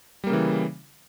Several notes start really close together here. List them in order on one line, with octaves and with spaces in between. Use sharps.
G3 A#3 C#3 E3